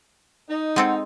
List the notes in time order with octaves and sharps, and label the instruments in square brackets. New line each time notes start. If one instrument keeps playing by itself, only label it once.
[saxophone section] D#4
[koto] G#3 C4 A4 [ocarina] F#5